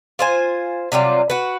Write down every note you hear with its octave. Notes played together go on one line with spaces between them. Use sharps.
F4 C5 G#5
C3 F#3 G3 F4
F#4 B4